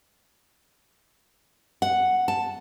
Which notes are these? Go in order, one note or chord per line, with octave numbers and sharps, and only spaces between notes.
F#5
A5